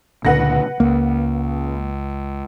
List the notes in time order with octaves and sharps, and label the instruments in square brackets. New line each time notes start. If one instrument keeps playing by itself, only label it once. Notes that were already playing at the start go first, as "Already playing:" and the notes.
[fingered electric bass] C#2 A#2 D3 [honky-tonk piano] B4 F#5 A#6
[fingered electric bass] C#2 [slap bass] A#3